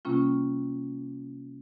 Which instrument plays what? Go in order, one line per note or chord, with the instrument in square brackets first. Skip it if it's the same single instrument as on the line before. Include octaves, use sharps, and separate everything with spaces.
[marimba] C3 G3 A#3 C#4 F4